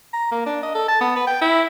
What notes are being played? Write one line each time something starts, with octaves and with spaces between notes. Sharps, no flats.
A#5
A#3
D4
D#5
A4
A5
B3
B4
G5
E4